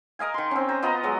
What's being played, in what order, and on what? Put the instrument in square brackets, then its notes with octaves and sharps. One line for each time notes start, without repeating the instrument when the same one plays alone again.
[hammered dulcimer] A#4 D#5 F5 G#5
D#3 C6
C4 C#4
C5 A#5
B3 F4 D#5 A#5
F#3 G#3 F#4